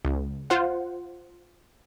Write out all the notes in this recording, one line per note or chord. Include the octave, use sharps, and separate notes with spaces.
C#2
F4 C5 F#5